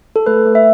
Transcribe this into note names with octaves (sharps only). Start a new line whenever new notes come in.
A4
A3 B4
A3
E5